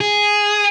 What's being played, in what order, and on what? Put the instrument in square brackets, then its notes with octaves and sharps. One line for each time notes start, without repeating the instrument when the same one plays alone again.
[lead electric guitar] G#4